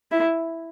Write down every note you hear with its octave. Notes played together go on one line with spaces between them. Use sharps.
E4